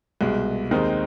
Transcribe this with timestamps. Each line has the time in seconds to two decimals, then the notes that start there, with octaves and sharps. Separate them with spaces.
0.21 C2 B2 G#3
0.71 D#2 D#3 G#3 C4 D#4